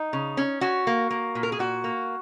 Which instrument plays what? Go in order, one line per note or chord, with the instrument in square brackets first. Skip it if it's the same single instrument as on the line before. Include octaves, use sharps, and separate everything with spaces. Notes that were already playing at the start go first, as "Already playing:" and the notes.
Already playing: [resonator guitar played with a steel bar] D#4
C#3
C#4
C#4 F#4
A#3
A#3
A#2
A#4
G#4
A#2 F#4
A#3